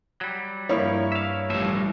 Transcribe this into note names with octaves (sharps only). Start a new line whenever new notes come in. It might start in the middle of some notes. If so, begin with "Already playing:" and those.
F#3 G3
G2 F3 G3 A#3 E4 C#5
E5 F5
A1 A2 F3 G3 E5